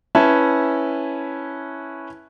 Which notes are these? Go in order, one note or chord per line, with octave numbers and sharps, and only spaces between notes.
C#4 E4 B4 E5 A5